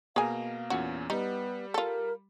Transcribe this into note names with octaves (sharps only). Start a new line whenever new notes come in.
B2 A#3 G#4 F5 G#5 A#5
E2 A#2 C#4 F#4
G3 B3 D#4
F4 A4 A#4